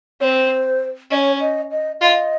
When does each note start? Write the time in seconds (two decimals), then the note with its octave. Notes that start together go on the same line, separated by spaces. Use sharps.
0.21 C4 C#5
0.24 C5
1.11 C#4 D#5
1.15 C#5
1.41 D#5
1.71 D#5
2.01 F4 D#5